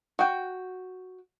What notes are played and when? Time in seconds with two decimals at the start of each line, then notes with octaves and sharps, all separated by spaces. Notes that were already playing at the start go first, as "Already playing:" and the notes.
0.19 F#4 G5